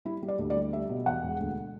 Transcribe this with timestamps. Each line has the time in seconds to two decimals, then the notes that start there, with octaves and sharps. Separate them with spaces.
0.05 G3 E4
0.23 G3
0.28 D5
0.39 D2
0.50 D5
0.56 G3
0.73 G3 E5
0.89 B2
1.06 E2 F#5
1.23 E1
1.40 D2